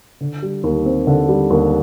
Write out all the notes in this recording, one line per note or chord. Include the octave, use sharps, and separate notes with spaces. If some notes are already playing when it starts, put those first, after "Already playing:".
D3
G3
D#2
C4
D3
G3
D#2